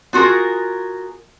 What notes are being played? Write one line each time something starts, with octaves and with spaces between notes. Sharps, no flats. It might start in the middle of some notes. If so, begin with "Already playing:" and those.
B3 F4 F#4 G#4 A#4